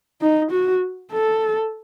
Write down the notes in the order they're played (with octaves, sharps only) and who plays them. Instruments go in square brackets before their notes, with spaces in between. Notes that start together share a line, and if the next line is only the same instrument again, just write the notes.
[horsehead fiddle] D#4
F#4
A4